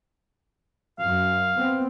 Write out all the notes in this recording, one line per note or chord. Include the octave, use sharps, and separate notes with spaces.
F#2 F5
B3 C4